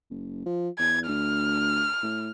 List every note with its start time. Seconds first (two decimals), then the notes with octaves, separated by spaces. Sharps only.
0.10 F#1
0.46 F3
0.79 E2 G#6
1.08 D2 F6
2.03 A2